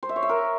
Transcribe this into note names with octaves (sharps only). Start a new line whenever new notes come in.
C5
E5
C#5
E5
A#4